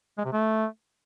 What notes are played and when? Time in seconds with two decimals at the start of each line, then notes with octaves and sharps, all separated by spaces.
0.18 G#3
0.25 C3
0.33 A3